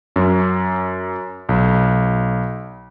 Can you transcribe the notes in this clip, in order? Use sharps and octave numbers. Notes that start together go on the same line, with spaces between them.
F#2
B1